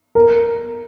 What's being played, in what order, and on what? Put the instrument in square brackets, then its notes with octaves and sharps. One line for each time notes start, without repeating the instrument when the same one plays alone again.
[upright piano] A#4